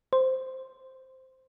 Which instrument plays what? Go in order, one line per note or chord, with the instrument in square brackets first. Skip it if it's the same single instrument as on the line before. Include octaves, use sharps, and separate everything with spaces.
[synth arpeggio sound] C5